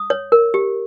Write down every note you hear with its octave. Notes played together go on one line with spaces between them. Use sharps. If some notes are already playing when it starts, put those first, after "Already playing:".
Already playing: D#6
C#5
A#4
G4